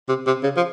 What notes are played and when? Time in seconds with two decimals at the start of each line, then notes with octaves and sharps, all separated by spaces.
0.08 C3
0.26 C3
0.43 C#3
0.57 F3